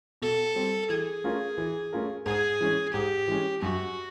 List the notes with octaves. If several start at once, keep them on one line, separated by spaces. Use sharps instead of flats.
B2 A4
G3 C4
E3 G#4
A3 C#4 F4 A#4
E3
A3 C#4 F4 A#4
G#2 G#4
E3 G#3 C#4
G#2 G4
E3 G#3 C#4
F#2 F#4